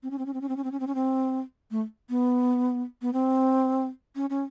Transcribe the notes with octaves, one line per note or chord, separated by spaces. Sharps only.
C4
C#4
C4
C#4
C4
C#4
C4
C#4
C4
C#4
C4
C#4
C4
A3
B3
B3
C4
C#4
C#4